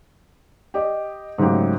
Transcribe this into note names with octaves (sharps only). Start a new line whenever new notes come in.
G4 D#5
G#2 C#3 F#3 A3 G4